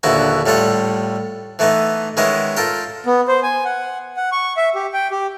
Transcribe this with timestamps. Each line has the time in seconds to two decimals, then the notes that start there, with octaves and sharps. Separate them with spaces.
0.03 A#1 D#2 D3 B3 E4 F#4
0.46 A2 G3 A3 F4 F#5
1.59 E3 A3 B3 D#4
2.17 D#3 G#3 B3 C#4 E4 D#5
2.56 F4 A4 A#4 G5
3.06 B3
3.28 C5
3.43 G#5
3.65 F#5
4.17 F#5
4.32 C#6
4.57 E5
4.75 G4
4.93 G5
5.11 G4